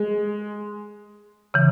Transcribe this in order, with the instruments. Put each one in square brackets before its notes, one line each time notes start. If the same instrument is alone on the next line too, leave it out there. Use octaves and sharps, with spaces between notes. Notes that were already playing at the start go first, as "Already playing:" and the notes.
Already playing: [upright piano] G#3
[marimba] C#3 E3